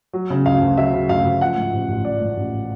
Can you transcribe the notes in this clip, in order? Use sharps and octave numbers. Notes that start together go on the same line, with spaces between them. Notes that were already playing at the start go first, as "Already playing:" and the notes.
F#3
C#3
D2 F5
D2
F#3 E5
C#3
D2 F5
D2
F3 F#5
G#2
A1
A1
F3 D5
G#2
A1